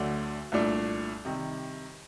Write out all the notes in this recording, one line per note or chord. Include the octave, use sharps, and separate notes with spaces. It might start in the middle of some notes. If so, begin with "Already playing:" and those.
Already playing: D2 D3 F#3 A3 D4
C2 A#2 A3 D4
C3 D#3 G3